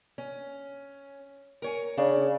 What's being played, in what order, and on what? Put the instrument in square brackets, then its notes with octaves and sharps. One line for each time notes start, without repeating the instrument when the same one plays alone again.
[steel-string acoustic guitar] C#4
A#4 C#5 G#5
[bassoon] C#3 [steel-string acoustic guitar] D4